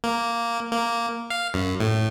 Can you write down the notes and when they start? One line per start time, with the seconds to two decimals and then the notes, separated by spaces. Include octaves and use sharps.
0.04 A#3
0.71 A#3
1.30 F5
1.54 F#2
1.80 A2